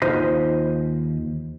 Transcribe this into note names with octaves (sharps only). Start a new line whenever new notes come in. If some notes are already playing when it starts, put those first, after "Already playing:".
D#2 D#4 F4 C5 D#5 B5